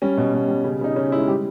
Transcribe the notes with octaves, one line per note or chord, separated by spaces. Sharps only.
G3 C#4
B2
B2
G3
C#3
C#3 D#4
C#3 C#4
G#3 E4
G3 G4